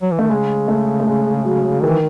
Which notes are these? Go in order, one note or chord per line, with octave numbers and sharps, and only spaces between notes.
F#3
E3
D#3 A3
C#3 G#3
A3
A3
G#3
F#3
D#3 E3